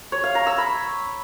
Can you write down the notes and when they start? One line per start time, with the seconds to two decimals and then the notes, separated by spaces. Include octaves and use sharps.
0.12 C#5
0.24 F5
0.35 A#5
0.47 E6
0.58 B5